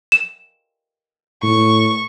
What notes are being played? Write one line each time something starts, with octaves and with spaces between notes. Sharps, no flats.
E7
A2 C#6